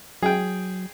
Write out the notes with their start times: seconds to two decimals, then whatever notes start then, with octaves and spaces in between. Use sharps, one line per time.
0.22 F#3 G#4 G5